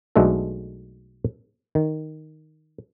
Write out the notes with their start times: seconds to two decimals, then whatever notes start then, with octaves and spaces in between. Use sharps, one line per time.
0.16 B1 B2 G#3 A3 D4 A4
1.75 D#3